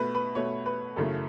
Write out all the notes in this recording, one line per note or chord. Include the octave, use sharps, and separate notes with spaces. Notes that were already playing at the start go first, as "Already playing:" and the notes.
Already playing: B2 A3 B4
B4
B2 A3 C#5
B4
F#2 C#3 E3 A3 A4